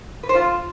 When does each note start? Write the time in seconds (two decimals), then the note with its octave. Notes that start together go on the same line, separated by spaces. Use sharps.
0.23 B4
0.29 C5
0.35 F4